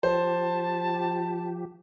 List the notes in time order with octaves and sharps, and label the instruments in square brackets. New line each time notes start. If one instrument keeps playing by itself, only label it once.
[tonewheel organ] F3 G4 [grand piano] C5 [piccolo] A5